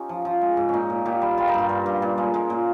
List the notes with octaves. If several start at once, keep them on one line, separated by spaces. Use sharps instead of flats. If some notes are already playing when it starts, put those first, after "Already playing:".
Already playing: C#4 D#4 F4 G4
F3
F3
G#3
G#2
A#2 C#4 D#4
A#2
A#2 G4
G3
G3 F4
D#4
G2 F4
G2
G2
A#2
G#3
G#3
A#2